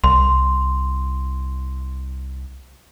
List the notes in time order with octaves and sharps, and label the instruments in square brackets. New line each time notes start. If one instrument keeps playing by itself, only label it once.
[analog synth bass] C2 [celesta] C6